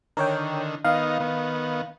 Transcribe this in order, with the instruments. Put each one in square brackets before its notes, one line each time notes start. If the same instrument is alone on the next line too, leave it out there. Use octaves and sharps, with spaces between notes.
[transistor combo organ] D3 D#3 [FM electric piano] A#4 C#5 G5
[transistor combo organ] D#3 B3 D#4 [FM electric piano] F5
[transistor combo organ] D#3 B3